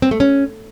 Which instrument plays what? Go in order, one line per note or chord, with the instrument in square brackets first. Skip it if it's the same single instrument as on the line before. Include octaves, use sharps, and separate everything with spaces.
[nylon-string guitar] C4
A3
C#4